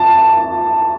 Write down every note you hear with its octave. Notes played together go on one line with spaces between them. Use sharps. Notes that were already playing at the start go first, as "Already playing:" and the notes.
Already playing: A5